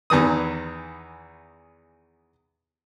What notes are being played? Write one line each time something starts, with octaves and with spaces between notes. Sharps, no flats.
E2 D#3 E3 D#6